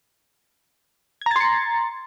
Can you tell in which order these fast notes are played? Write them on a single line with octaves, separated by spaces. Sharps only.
G#6 A#5 A6 C6 C#7